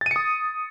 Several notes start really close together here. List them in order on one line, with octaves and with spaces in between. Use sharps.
A6 D#7 C#7 D#6